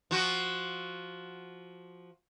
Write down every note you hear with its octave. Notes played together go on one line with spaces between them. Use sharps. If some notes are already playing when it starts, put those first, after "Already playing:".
F3 F#4